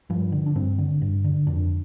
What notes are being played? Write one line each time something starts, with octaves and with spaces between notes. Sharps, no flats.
G2 F3
D3
D4
G2 C4
D3
G2
D3
F2 D4